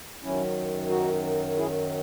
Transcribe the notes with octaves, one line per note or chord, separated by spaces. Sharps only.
F#2 D#3 F#3 C#4 E4
D#4 F#4
E4 G#4